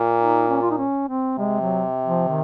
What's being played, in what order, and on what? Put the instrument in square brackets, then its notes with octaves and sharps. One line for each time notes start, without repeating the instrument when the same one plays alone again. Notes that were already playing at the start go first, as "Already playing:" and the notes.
Already playing: [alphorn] A#2
[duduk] D#4
C#4
F4
D#4
C#4
C4
[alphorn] C3 [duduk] G#3
[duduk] F#3
F3
D#3